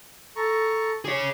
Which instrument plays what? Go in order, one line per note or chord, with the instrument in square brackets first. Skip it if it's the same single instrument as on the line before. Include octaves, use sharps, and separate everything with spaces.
[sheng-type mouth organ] A4 A#5 C#6
[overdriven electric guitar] G#4 C#5 [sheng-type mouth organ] D6